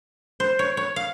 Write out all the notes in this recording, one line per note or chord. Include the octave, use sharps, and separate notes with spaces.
C5
C#5
C#5
F5